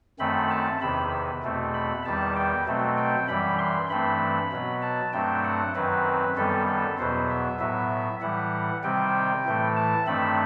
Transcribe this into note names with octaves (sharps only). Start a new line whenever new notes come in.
F#2 D#3 A3 C4 B5
A5
E2 C3 D#3 B5
E2 B2 A3 C4
B5
E2 D#3 G3 A5
G5
B2 F#3 A3 C4
G5
F#2 E3 G3 B5
C6
G2 E3 A3 C4 B5
B2 F#3 B3
A5
G2 F#3 A3 C4 G5
F#5
F#2 D#3 F#3 C4 B4
F#2 D#3 G3 B3 A4
A4
E2 B2 F#3 B3 C5
E5
A2 F#3 B3 E5
A2 E3 G3 F#5
C3 D#3 G3 C4 G5
A2 E3 A3
A5
G2 D#3 A3 C4 B5